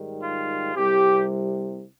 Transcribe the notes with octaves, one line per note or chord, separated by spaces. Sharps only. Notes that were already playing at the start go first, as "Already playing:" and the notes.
Already playing: G#2 D#3 G3
F4
C2 C3 G3 G4